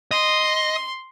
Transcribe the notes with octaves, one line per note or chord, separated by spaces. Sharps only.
D#5 C6